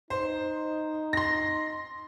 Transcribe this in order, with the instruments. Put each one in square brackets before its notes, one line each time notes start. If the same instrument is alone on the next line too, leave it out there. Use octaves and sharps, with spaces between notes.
[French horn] D#4 [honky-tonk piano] C5
[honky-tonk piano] C6 A#6